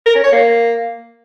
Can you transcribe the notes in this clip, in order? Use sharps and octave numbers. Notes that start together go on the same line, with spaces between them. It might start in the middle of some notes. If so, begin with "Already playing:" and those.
A#4
C#4
C#5
A#3